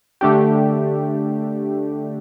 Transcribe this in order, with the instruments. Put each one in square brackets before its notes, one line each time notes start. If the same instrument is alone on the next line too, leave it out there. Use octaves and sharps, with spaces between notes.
[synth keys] D3 A3 D4 G4